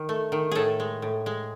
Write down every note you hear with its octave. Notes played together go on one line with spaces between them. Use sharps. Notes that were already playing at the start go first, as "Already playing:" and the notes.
Already playing: D#3
A3
D#3
A2 G#4 A4
G#3
A2
G#3